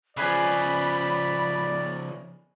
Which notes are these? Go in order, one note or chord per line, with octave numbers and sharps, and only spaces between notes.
C#3 F3 G#4 B4 D5 G#5 B5